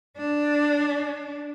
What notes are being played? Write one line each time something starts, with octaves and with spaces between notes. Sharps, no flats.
D4